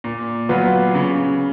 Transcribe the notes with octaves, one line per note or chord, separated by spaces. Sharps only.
A#2
F#3 B3 F4 B4
C#3